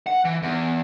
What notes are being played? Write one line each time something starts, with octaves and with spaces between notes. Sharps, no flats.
F#5
E3
E2